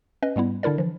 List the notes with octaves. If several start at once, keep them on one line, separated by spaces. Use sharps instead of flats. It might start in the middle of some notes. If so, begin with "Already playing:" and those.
C#4 B4 D#5
G#2 G3 B3 E4
D3 D4 E4 A#4 D5
E3 F3